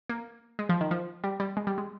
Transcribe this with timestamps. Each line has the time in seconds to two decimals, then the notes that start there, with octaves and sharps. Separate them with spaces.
0.09 A#3
0.59 G#3
0.69 F3
0.81 D#3
0.91 F3
1.24 G3
1.40 G3
1.57 G#3
1.67 G3
1.78 G#3